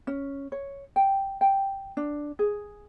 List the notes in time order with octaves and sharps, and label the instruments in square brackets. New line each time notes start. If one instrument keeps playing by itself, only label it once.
[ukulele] C#4
C#5
G5
G5
D4
G#4